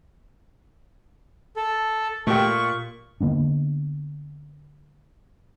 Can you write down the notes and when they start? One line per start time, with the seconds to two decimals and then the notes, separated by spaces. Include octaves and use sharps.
1.56 A4
2.27 A#2 A3 G4 C#6
3.21 D3 A#3 B3 D4